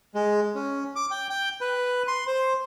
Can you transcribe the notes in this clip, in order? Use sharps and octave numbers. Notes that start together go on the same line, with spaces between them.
G#3
C#4
D6
G5
G5
B4
C6
C5